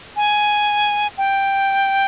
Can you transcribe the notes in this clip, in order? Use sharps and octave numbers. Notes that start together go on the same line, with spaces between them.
G#5
G5